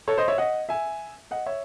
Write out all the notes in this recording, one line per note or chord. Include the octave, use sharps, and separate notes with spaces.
A4 C#5
C5 D#5
C#5 E5
D#5 F#5
E5 G#5
D#5 F#5
C#5 E5